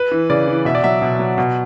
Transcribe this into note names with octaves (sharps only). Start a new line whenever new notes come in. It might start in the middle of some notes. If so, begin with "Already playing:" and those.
Already playing: B4
E3
C#3 D5
E3
B2 E5
D5
F#3 E5
B2
F#3
B2